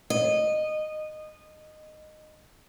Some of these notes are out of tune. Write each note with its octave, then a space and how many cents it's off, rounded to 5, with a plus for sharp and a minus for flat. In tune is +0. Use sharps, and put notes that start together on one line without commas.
D#5 -15